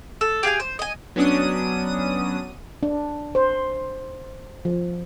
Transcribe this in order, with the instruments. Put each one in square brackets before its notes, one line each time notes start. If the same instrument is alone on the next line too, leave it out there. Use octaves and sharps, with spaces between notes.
[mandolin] A4
G4 G#4 F5 G#5
C5
D#5 G#5
[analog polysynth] F#3 B3 C#4 D4 D#6 D#7
[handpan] D4
C5
F3